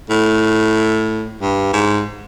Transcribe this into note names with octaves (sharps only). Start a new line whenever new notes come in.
A2
G2
G#2